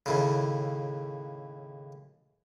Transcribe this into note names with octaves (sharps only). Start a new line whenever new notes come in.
D#2 A2 C#3